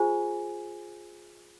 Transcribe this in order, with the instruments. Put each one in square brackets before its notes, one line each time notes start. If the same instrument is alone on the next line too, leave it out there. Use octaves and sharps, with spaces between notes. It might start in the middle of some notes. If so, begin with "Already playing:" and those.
Already playing: [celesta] F4 G#4 C5 G#5